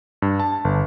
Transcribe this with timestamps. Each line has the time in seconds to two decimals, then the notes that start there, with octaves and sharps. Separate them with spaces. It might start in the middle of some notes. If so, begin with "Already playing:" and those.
0.22 G2
0.40 A5
0.65 G1